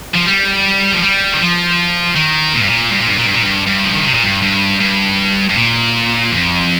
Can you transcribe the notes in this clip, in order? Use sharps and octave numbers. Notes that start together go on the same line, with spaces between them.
F3
G3
F3
G3
D#3
F3
D#3
A#2
G2
A#2
G2
A#2
G2
A#2
G2
A#2
G2
G2
F3
D#3
C3
A#2
G2
G2
G2
G2
A#2
F2